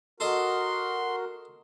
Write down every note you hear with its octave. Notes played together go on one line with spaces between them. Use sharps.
F#4 A4 A#4 D#5 C6